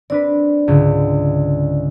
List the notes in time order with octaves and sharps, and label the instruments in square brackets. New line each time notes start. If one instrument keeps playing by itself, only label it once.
[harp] C4 D4 B4 [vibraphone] D5
[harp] C#2 G#2 D3